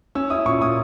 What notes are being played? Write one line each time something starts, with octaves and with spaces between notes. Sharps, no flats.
C#4 E6
E4 D#6
A#2 C#6
A#2 D#6